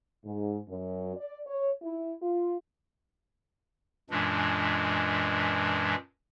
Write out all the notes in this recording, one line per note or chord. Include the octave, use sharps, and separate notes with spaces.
G#2
F#2
D5
C#5
E4
F4
F#2 A#2 E3 G#3 D4